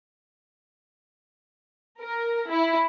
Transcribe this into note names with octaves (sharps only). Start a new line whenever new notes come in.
A#4
E4